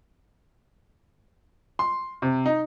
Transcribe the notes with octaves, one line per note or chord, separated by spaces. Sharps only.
C6
C3
D#4